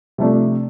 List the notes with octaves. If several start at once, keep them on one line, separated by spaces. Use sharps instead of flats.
C3 F3 A3 D4